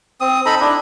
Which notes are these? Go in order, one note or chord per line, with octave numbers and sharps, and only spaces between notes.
C4 D#6
D#4 A4 A#5 B5
D4 E4